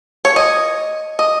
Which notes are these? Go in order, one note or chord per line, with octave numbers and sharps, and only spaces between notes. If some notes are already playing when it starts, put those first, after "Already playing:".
C#5
D#5
D#5